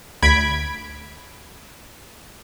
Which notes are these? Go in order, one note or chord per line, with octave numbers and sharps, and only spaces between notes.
D2 B5 G#6 B6 D7